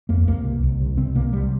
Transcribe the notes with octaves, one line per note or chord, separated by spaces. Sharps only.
F2 A#3
C2 A#3
C3
C2
C3
C2 C4
C3 A#3
C3 G3